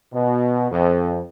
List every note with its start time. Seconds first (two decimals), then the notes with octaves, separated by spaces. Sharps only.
0.13 B2
0.71 F2